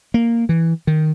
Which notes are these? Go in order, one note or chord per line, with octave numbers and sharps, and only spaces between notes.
A#3
E3
D#3